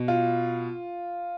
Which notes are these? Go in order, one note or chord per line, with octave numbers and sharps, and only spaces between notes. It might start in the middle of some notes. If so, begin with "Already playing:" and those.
Already playing: B2
F4